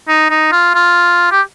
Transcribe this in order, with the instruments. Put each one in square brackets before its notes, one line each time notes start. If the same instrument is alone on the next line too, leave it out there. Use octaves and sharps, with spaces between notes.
[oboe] D#4
D#4
F4
F4
G4